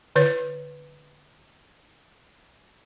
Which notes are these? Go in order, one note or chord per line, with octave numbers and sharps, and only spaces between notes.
D3 B4 C#5